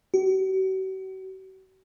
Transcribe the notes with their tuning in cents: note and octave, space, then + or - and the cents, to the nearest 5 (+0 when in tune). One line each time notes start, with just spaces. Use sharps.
F#4 +45